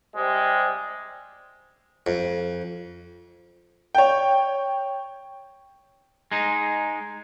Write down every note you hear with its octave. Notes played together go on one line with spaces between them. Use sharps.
C3 G3 G#3
F2
C#5 G5
G#3 D#4